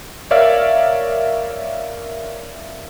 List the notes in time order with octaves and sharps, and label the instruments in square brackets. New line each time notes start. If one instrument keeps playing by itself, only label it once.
[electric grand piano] A#4 C#5 D5 E5 F5